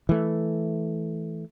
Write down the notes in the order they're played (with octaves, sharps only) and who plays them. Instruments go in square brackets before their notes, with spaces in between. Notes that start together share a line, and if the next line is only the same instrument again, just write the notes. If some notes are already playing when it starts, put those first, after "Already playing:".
[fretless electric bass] E3 A3